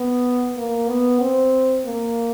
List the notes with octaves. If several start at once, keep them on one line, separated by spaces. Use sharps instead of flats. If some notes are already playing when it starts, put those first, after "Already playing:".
Already playing: B3
A#3
B3
C4
A#3